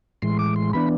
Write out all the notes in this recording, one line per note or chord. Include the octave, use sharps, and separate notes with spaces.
A2 E3 G#3 C6
D6
C6
E3 B3 D4 B5